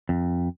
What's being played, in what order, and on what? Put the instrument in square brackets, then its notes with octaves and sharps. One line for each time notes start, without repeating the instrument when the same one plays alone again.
[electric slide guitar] F2